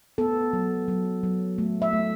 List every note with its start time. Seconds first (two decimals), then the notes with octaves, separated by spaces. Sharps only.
0.18 B3 A4
0.53 F#3
0.88 F#3
1.23 F#3
1.58 A3
1.82 E5
1.93 A3